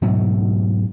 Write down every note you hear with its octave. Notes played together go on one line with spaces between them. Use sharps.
G#2 B2 F#3 A3